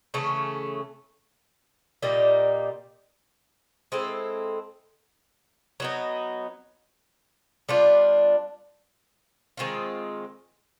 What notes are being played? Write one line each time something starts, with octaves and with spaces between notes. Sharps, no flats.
C#3 E3 A3 C#4
A#2 G3 A#3 D#4
G#3 C4 E4 A4
F#3 B3 D#4
G3 B3 D4 F4
D#3 G#3 C4 F4